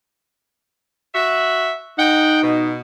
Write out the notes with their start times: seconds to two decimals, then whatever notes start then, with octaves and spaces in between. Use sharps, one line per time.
1.14 F#4 E5
1.98 D#4 F#5 G5
2.42 B2